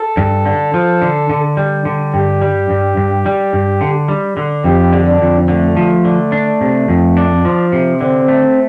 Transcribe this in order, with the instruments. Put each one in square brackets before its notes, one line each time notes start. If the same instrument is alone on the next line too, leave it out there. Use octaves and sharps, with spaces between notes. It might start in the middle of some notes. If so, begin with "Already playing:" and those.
Already playing: [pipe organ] A4
[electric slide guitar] G2
D3
F3
D3
D3
G3
D3
[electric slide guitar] G2 [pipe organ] G4
[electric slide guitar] G3
G2
G2
G3
G2
D3
G3
D3
[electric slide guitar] F2 [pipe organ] G4
[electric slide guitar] D3
[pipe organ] D4
[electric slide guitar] F2
[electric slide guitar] D3 [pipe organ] A3
[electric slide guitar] F3
D3
D4
C3
F2
D4
F3
C3
[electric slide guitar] D3 [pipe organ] C4
[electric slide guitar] A3